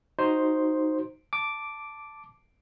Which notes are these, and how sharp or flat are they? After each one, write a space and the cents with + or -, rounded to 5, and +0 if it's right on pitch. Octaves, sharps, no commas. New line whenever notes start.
D#4 +0 F#4 +0 C5 +0
A5 +0 D6 +0